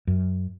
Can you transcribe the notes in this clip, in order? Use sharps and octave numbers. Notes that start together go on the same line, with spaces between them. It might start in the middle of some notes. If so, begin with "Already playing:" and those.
F#2